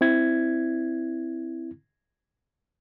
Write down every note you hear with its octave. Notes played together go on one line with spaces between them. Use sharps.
C4 E4 G#6